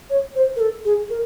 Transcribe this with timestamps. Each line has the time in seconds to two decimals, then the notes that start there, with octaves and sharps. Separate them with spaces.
0.10 C#5
0.35 C5
0.56 A#4
0.60 A4
0.85 G#4
1.10 A#4